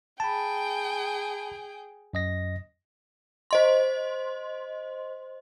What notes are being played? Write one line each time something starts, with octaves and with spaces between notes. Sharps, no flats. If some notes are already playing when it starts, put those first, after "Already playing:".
G#4 G5 A5 B5
F#2 D#5 A#6
C5 D#5 C6